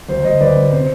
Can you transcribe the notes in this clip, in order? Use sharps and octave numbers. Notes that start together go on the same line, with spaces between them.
D2 C5
D2 C5 D#5
D2 B4 D5
D2
C3 C5